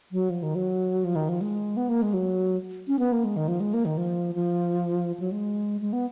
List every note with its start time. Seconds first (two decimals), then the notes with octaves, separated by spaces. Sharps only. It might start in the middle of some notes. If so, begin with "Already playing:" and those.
0.12 F#3
0.30 F3
0.43 D#3
0.55 F#3
1.04 F3
1.16 D#3
1.29 F3
1.41 G#3
1.77 B3
1.89 A#3
2.02 G#3
2.14 F#3
2.88 C#4
2.99 B3
3.12 A#3
3.25 G#3
3.36 D#3
3.48 F3
3.60 G#3
3.74 A#3
3.85 D#3
3.98 F3
4.35 F3
5.20 F#3
5.32 G#3
5.81 G#3
5.93 B3